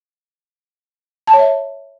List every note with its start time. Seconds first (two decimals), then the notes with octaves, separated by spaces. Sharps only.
1.27 A5
1.33 C#5
1.39 E5